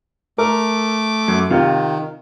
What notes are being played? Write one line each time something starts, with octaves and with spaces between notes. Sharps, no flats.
A3 A#4 D6
F#2
C3 D#3 F4